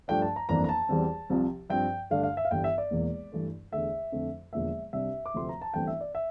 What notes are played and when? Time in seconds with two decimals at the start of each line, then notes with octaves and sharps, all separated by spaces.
0.08 G2 F3 A3 D4 G5
0.22 A5
0.36 A#5
0.49 G1 F2 E3 A#3 D4 A#5
0.64 A#5
0.69 A5
0.89 E2 E3 G3 C4
1.30 C2 C3 F3 C4
1.70 G2 F3 C4 G5
2.10 G2 D3 A3 D4 F5
2.23 F5
2.37 E5
2.45 F5
2.51 G1 G2 E3 G3 G5
2.64 E5
2.78 D5
2.91 E1 E2 E3 A#3
3.32 G2 E3 A3 D4
3.72 E2 D3 A3 E5
4.12 F2 D3 A3 C4
4.53 E1 E2 D3 F3 A#3 E5
4.93 C2 C3 G3 D4 E5
5.26 D6
5.34 D2 C3 F3 A3 C4 C6
5.49 A#5
5.61 A5
5.74 G1 G2 E3 A3 C4 G5
5.87 E5
6.01 D5
6.15 E5